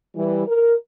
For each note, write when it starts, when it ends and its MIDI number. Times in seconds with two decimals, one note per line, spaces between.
0.15 0.47 52
0.15 0.47 55
0.47 0.74 70